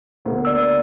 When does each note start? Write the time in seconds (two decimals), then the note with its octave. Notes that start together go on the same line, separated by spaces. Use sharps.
0.25 G1 D2 A#3
0.45 D5 E6